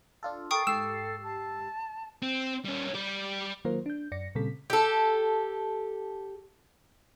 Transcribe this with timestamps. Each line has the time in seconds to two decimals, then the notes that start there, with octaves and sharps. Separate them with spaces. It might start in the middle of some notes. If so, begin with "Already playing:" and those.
0.23 D4 F4 A4
0.51 A4 A#4 G5 C#6 D#6 C7
0.67 G#2 G4 A4 E6 C7 E7
1.23 A5
2.22 C4
2.65 G3 C#4
2.94 G3 G4
3.65 D#3 F#3 A#3 F4 A#4 C5
3.86 D4 G6
4.12 F#2 D5 A#6 C#7
4.35 A#2 C#3 G3 C4 A4 B6
4.70 G4 A4